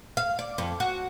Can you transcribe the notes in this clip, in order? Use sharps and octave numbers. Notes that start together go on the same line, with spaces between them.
F5
D5
F2
F#4